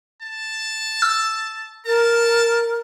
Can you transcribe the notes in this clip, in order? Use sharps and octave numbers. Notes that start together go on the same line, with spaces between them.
A5
E6
A#4 A5